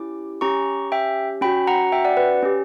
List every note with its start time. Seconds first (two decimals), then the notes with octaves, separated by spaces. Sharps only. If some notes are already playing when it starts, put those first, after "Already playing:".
Already playing: C#4 E4 G4 D6
0.41 C#4 G4 A#5 C#6
0.92 E5 G5
1.41 C#4 F#4 G5 B5
1.68 F#5 A#5
1.92 E5 G5
2.05 D5 F#5
2.17 B4
2.42 C#4 G4